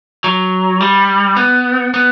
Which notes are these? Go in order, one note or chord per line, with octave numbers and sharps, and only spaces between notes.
F#3
G3
B3
B3